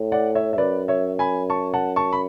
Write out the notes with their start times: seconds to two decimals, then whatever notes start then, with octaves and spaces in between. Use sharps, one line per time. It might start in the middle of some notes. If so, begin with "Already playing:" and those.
Already playing: A2
0.12 D5 F#5
0.35 C#5 E5
0.53 E5
0.58 F#2 B4 D5
0.88 C#5 E5
1.19 G#5 B5
1.50 A5 C#6
1.74 F#5 A5
1.96 A5 C#6
2.13 B5